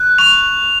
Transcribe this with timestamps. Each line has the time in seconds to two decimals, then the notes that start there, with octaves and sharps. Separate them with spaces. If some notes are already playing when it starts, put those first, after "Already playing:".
Already playing: F#6
0.18 C#6 F7